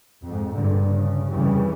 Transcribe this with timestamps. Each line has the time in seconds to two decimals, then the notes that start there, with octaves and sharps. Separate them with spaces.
0.24 F2 G#2
0.54 G2 A#2 D3
0.87 C#3
1.29 F2 C#3 E3 G3